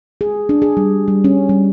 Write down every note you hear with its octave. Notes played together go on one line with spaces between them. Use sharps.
G#4
D4
G#4
G3
G3
C#4
G3